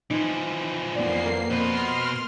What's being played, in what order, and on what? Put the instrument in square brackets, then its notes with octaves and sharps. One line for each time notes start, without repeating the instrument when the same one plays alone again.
[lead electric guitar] E3 F3 [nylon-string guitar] D#4
[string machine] F2 A#3 C7 [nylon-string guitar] B3 D5
[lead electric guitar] B2 B4 [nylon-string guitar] C5 [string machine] C6 F6